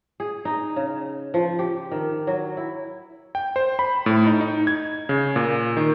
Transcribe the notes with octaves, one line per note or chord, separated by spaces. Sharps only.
G#4
D#4
C#3
F3
G4
D#3
F#3
E4
G5
C5
B5
A2
D#4
D#4
G#6
C#3
A#2
D#3